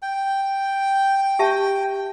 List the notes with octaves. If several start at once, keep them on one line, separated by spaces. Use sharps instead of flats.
G5
G4 E5 A5